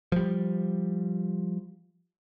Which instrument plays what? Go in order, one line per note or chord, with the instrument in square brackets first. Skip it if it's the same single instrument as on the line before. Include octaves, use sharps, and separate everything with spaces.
[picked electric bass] F3 G3